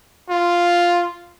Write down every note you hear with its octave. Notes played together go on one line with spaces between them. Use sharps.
F4